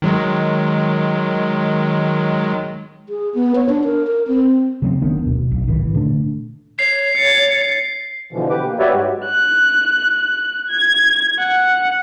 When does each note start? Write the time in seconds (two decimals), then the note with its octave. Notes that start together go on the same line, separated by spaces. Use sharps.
0.02 D#3 F#3 G#3
3.09 G#4
3.35 B3
3.55 C#5
3.69 D4
3.85 A#4
4.07 A#4
4.28 C4
4.82 C#3 F#3 G#3 C4
5.02 F1 D#3 B3 D4
5.24 D1 B2
5.51 B1
5.67 F1 A2 D#3 E3
5.93 A#2 D3 A3 D4
6.79 C#5 C7
7.14 A6 C#7
8.32 B2 D3 E3 F3
8.50 G4 B4 D6
8.65 A#3
8.79 F#4 G4 B4 C#5 D5 E5
8.92 G#2 G3 G#3 F#4
9.25 F#6
10.16 F#6
10.69 G#6
11.39 F#5